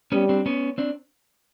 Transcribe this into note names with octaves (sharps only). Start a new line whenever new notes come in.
G3 B3 C#4
C4 D4
B3 C#4
C4 D4